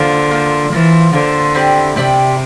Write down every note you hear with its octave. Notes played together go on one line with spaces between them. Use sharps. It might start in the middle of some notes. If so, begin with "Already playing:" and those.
Already playing: D3 A#3 F4 C5
A#3 F4 C5
E3 A#3 F4 C5
D3 A#3 F4 C5
C4 E4 G4 D5
C3 C4 E4 G4 D5